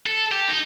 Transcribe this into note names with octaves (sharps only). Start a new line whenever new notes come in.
A4
G4
D#4